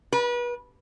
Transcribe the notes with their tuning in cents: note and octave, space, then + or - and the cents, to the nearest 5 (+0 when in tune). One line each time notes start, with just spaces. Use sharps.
B4 -35